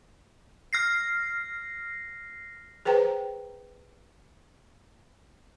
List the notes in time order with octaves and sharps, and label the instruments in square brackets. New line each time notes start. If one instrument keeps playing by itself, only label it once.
[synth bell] F6 A#6 C7
[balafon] G#4 B4 C5 G5 A#5